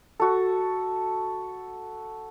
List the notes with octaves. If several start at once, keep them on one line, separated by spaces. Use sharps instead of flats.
F#4 A4